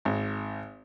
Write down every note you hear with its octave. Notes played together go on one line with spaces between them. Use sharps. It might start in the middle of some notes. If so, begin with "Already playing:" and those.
G#1